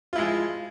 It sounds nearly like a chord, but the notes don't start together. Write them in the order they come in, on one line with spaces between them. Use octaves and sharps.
F4 E4 G#3 F3